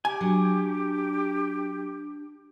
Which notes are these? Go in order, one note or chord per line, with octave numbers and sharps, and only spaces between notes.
G4 G#5
F#3 D4